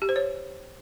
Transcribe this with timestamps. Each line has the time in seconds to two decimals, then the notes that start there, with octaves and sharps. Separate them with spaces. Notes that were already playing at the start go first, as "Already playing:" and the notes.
0.02 G4
0.09 C5
0.16 C#5